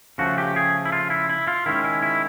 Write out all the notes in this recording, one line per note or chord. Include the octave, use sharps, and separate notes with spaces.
C#3 F3 A3 F#4
G4
G#4
E4
F4
E4
E4
F4
D#3 G#3 C#4 E4
E4
E4